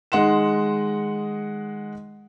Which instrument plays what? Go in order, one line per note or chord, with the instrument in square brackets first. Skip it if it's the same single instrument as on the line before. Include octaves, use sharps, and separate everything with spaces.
[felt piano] D#3 G#3 D#5 F#5 C6 E7